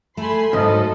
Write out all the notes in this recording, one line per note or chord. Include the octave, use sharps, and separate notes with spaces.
A3 G#5 B5 C6
C#2 G#2 F#3 A#3 A4 D#5